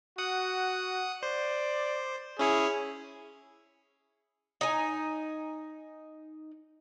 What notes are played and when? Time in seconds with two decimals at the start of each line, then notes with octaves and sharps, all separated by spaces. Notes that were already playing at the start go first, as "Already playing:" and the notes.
0.18 F#4 F#5 D#6
1.23 C5 D5
2.39 C#4 E4 G#4 C#5
4.61 D#4 G#5